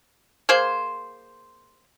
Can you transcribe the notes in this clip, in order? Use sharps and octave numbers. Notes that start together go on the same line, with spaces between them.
A#3 G#4 C5